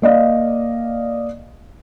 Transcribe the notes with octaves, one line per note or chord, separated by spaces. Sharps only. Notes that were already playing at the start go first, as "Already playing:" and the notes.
A#3 D5 D#5 F5